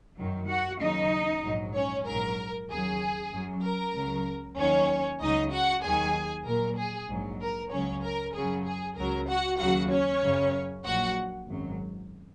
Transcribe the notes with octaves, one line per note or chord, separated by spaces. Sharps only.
F#2 D#3 F#3
F#4 F#5
D#2 C#3 F#3 D#4 D#5
A#1 G#2 F#3
C#4 C#5
A#1 G#2 F#3 A#4
D#2 C#3 F#3 G#4
F#2 F#3
A#4
C#2 C#3 F#3
D#2 D#3 F#3 C#4 C#5
C#2 C#3 F#3 D#4 D#5
F#4 F#5
D#2 D#3 F#3 G#4 G#5
A#1 A#2 F#3 A#4
G#4
A#1 G#2 F#3
A#4
C#2 C#3 F#3 C#4 C#5
A#4
F#2 C#3 F#3 G#4
G#4
C#2 C#3 F#3 A#4
F#4 F#5
D#2 C#3 F#3 F#4 F#5
C#4 C#5
F#2 C#3 F#3
A#1 A#2 F#3 F#4 F#5
G#1 F#2 F#3